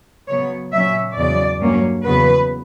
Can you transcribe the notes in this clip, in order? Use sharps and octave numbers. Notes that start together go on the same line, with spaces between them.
C#3 F#3 B3 C#5
A#2 F#3 C#4 E5
E2 C#3 F#3 D5
G2 F#3 A#3 C#4
E2 C#3 F#3 B3 B4